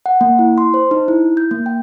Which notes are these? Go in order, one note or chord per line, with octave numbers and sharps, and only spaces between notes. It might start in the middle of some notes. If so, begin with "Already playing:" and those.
F#5
A#3
E4
C6
C5
D#4
E4
G6
A#3
G5